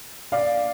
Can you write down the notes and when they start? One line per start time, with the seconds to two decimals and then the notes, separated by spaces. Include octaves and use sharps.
0.32 D5 F5